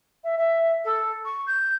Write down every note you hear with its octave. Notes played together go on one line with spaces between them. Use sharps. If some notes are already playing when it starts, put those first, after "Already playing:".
E5
E5
A4
C#6
G6